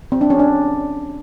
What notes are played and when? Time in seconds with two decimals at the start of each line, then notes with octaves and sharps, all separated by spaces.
0.12 C4
0.21 D4
0.30 C#4
0.39 D4